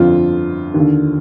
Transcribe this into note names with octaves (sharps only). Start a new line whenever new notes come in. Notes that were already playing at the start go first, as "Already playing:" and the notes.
Already playing: G1 F2 D3 F4
D#2 D3